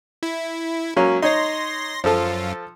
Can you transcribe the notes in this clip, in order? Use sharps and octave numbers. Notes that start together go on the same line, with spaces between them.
E4
F#3 A#3 C#4
D#4 C#5 C6 A#6
F#2 F3 F4 A4